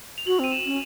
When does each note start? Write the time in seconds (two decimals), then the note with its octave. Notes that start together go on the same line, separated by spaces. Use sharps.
0.18 F7
0.27 F#4 F#7
0.39 C4 D#7
0.52 E7
0.65 C#4